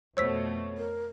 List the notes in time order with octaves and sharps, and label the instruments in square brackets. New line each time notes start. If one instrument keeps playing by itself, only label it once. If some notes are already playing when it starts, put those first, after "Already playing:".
[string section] F2 B2 A3 [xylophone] C5 E6 B6 [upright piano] C#5
[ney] A#4